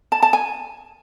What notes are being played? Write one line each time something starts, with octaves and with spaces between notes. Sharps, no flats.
A5
A5
G#5